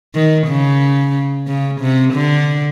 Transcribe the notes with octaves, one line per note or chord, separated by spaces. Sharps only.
D#3
C#3
C#3
C3
D3